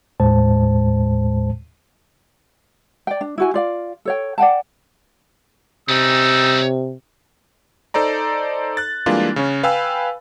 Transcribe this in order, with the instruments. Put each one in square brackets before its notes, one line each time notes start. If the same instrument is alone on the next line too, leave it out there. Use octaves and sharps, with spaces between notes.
[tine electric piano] D#2 A2 G#3 C5 A5
[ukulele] D5 G5
D4
E4 F#4 G#5
F4 D5 F5
A4 C#5 G5
D5 F#5 G5 A5
[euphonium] C3 [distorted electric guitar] G3 C#4 [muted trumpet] D#4 [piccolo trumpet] E6
[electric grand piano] D#4 A4 C5 D5 A#5
F#6 A6
E3 G3 G#3 A#3 D4 F4
C#3 C#4
B4 F5 G5 G#5 B5 E6